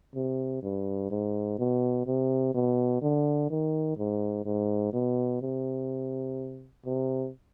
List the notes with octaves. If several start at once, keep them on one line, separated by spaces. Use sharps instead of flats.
C3
G2
G#2
B2
C3
B2
D3
D#3
G#2
G#2
B2
C3
C3